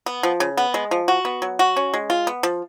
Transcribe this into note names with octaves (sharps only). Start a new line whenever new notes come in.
B3
F3
C#3
B3
G#3
F3
F#4
B3
F#3
F#4
C#4
G#3
F4
B3
F3